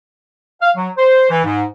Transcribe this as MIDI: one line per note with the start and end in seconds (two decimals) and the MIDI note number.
0.60 0.70 77
0.75 0.89 54
0.97 1.28 72
1.29 1.43 52
1.44 1.62 44